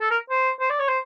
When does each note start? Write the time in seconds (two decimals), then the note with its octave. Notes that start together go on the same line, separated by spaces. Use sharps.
0.01 A4
0.10 A#4
0.30 C5
0.60 C5
0.70 D5
0.79 C#5
0.89 C5